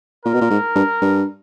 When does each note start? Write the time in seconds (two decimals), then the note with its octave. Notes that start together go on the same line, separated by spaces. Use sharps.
0.25 A#2 A#4
0.33 B2
0.41 A#2
0.50 G#2
0.75 G2
1.02 G2